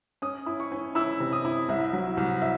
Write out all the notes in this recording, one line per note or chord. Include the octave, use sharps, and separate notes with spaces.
C#4 D#6
E4
C#6
C#4
E4 E6
C3
D#6
E4
C2 E5
F#3
C2
E5